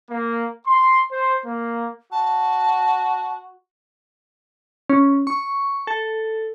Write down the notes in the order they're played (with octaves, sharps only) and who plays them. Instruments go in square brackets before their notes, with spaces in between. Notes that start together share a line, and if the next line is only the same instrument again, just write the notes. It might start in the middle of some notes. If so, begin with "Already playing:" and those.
[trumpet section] A#3
C6
C5
A#3
[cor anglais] F#4 [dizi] A5
[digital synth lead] C#4
C#6
A4